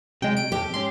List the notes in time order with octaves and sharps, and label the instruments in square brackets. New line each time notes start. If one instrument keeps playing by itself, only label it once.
[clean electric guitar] C3 F#3 [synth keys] G#3 G5
[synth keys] D7
[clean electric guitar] F2 A4 [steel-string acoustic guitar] G4
[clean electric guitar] G#2 C#4 [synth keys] C6